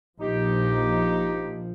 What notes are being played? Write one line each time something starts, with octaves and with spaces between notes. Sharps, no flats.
A#1 F3 D#4 G4